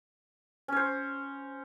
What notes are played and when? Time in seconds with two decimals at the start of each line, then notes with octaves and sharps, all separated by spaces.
0.68 C#4
0.72 C#5
0.76 C5